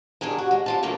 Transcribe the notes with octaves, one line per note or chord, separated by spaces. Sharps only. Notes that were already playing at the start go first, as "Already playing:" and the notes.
G2 D#3 D4 G#4 A#4
F#4
G#3
G3 F4 A5
C#3 E3 G3 A3 A#3 D4